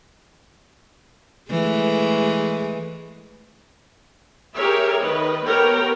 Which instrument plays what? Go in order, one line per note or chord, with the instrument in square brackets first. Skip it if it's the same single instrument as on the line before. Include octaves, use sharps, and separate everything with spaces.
[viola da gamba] E3 G#3 A3
[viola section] G4 G#4 A#4 C#5 E5
D#3 B4 D#5
B3 G4 A#4 B4 C#5 G5